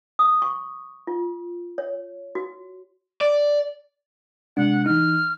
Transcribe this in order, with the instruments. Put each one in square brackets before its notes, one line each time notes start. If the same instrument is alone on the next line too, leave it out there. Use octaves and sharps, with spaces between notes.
[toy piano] D#6
C#6
F4
C#5
F#4
[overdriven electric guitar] D5
[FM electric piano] C3 G#3 D4 [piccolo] F#5
[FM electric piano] E3 D#4 [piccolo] F6